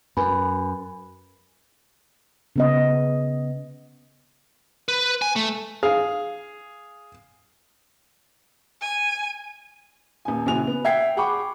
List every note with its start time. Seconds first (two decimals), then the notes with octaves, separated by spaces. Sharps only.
0.17 F#2 B4 G#5 B5
2.56 C#3 B3 D#5
4.88 B4
5.22 G#5
5.36 A3
5.83 G#4 F5
8.82 G#5
10.25 D#1 G#5
10.46 A#1 C#3 E3 F#4 G#5 F7
10.67 B3
10.85 E5 F#5 G5 G#6 C7
11.17 G#4 F#5 G5 B5 C#6 D6